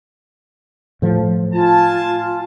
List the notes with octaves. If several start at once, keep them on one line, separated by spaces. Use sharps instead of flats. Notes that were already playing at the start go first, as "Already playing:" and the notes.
A2 F3
F4 G#5 A5